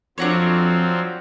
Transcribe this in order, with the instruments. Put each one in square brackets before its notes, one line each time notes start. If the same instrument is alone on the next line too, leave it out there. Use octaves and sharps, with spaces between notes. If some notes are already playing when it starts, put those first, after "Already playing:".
[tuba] F2 [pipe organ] F3 F#3 C4 [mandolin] D4 F#4 C#5